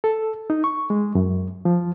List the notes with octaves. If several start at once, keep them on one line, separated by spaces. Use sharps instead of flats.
A4
D#4
C#6
G#3
F#2
F3